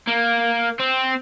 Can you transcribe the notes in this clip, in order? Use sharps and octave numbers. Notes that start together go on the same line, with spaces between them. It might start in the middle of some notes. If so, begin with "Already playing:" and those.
A#3
C4